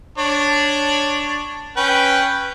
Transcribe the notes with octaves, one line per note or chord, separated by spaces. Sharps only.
D4 C#5
C#4 B4 G5